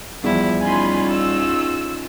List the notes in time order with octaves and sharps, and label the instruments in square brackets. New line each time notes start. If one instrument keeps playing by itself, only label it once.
[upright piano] E2 [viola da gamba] F3 E4 [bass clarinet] G3
[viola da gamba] C#4 D#4 F4 [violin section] G#5 B5 C6
[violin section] E6